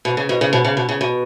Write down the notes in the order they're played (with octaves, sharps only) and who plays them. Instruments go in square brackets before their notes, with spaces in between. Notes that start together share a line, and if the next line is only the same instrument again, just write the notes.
[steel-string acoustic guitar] B2
C#3
B2
C#3
B2
C#3
B2
C#3
B2